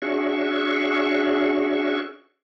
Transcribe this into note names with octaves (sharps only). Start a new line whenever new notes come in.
C#4 D4 F#4 G#4 E5 C#6